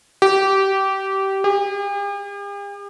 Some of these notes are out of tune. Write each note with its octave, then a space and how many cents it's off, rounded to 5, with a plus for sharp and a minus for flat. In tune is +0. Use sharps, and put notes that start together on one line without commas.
G4 -20
G4 +45